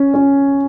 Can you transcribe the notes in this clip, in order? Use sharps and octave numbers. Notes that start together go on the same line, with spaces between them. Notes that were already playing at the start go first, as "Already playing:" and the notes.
Already playing: C#4
C#4